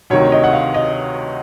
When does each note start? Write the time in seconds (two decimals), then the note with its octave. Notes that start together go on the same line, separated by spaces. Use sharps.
0.10 D2 C3 D#3 C#5
0.32 D#5
0.44 F#5
0.53 F5
0.74 D#5